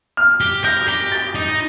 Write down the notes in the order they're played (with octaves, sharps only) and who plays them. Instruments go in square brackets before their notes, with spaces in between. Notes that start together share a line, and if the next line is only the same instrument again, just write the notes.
[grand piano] F6
[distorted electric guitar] G4
[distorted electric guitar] A#4 [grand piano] G6
[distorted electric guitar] G4
[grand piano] A6
[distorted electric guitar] D#4